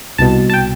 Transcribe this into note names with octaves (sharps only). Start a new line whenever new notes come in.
C2 B2 A5
A5
G5